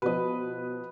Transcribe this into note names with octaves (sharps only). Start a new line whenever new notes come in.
B2 F3 B4 D#5